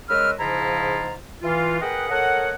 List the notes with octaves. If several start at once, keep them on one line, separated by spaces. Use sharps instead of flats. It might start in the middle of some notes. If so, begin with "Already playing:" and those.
C#3 G#3 A#4 B4 E6 F6
G#2 C#3 F3 E4 F4 A#5
E3 F4
G#4 A#4 B4 D#5 F#5 G5
A4 A#4 C#5 D#5 F#5